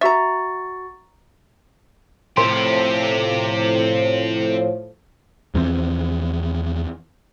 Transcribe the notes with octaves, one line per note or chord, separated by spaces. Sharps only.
F#4 E5 A#5 C#6 A6
A2 F3 C4 G4 A#4 C6
E2 E3 F3 C4